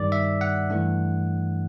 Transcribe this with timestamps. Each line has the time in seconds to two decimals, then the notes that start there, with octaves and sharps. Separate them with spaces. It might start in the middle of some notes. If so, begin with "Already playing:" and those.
Already playing: G2 D#3 G3 D5
0.12 E5
0.41 F#5
0.70 G2 E3 A3 D4